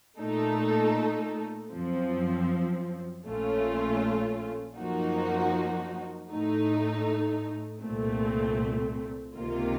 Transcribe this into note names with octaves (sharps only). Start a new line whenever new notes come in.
A#2 A3 D#4 A4
F#2 F3 C4
A#1 A#2 A3 C#4 F4
F#2 F3 A#3 D#4 F#4
A2 A3 D#4
C2 A#2 A3 C4
C#2 C3 D#3 A#3 F4